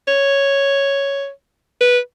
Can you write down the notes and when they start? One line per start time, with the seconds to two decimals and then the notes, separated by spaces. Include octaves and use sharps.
0.08 C#5
1.81 B4